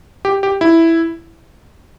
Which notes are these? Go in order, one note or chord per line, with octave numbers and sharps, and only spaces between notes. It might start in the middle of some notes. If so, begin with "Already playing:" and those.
G4
G4
E4